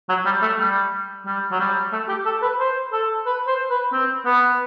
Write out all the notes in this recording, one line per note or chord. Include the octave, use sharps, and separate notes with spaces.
F#3
G3
A3
G3
G3
F#3
G3
A3
G4
A4
B4
C5
A4
B4
C5
B4
C4
B3